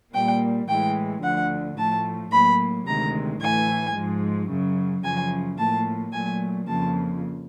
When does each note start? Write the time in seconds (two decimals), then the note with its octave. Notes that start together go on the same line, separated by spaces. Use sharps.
0.14 A#2 G3 A#3 G5
0.68 A2 E3 G#3 G5
1.23 D2 D3 F3 F#5
1.77 A2 F3 A3 A5
2.31 A2 F#3 A#3 B5
2.86 D2 C3 D#3 G#3 A#5
3.41 A2 E3 A3 G#5
3.95 G#2 F3 G#3
4.49 F#2 C#3 F#3
5.04 F#2 C#3 F3 G#5
5.58 A2 F3 A#3 A5
6.13 A#2 F#3 A3 G#5
6.67 F2 C#3 F3 A#3 A5